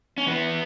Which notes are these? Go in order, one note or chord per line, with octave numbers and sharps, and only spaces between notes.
C#4
E3 B3